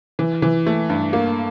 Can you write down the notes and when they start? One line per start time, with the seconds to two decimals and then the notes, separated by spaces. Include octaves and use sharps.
0.19 E3
0.42 E3
0.66 A3
0.89 G2
1.13 A#3